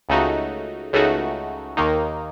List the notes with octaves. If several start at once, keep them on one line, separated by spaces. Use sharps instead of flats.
C#2 C#3 A3 D#4 F#4
C#2 C#3 A3 D#4 F#4
D#2 D#3 A#3 D#4